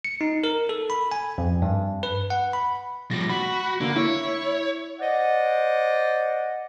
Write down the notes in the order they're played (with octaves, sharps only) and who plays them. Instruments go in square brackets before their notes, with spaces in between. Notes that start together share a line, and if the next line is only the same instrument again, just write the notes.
[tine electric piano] C#7
D#4
A#4
A4
B5
G#5
F2
G2
B4
F#5
B5
[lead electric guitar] F3 G3 [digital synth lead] A#6
[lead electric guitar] F#4 [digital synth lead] B5
[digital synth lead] D3 [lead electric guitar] A#3
[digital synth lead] E4 [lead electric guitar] C#5
[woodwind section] C5 D5 D#5 F#5